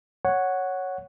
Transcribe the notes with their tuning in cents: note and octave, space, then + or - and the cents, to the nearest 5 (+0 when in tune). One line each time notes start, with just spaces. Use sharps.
C#5 +0 F#5 +0